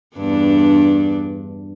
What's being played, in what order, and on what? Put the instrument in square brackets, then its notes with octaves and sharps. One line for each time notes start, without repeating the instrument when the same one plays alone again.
[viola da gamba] E2 G2 D4